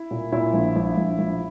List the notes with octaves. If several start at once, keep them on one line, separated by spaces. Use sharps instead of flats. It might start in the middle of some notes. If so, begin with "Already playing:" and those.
Already playing: E4
A#2
A#2 E4
A#1
A#1
A#1
A#1